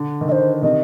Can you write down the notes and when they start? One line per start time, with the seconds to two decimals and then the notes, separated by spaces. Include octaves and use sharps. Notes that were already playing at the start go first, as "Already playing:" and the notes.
Already playing: D3
0.21 D#3
0.28 D3 D#5
0.32 C5
0.63 C3 D#3 D#5